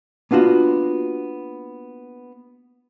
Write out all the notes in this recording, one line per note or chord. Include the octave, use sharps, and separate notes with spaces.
A#3 B3 D4 F4 F#4